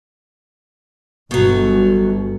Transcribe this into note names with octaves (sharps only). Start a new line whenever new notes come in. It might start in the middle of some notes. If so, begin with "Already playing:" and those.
G1 B2 F#3